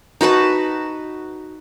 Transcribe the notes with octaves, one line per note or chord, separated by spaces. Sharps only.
D#4 F#4 B4 A5